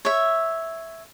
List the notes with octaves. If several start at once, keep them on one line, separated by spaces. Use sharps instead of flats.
C#5 E5